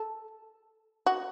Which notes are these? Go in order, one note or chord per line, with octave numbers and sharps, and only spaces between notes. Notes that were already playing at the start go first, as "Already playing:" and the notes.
Already playing: A4
F#4